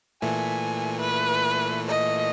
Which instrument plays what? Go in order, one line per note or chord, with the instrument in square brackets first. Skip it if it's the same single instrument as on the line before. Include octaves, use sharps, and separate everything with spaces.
[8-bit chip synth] A#2 E3 A3 [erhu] G#5
[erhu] B4
D#5